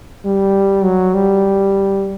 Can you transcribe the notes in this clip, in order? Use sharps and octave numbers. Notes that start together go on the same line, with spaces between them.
G3
F#3
G3